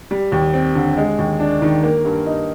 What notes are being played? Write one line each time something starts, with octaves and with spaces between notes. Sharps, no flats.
G3
D#2
C4
D3
G#3
D#2
D4
D#3
A#3
G2
D#4